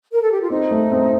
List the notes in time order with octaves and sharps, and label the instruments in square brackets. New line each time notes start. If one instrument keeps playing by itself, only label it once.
[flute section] A#4
A4
G4
F4
[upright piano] C4 [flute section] D#4
[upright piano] A3
C4